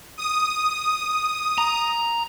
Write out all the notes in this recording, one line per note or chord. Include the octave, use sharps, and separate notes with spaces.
D#6
A#5